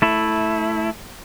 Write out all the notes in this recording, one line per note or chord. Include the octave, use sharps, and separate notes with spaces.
A3 E4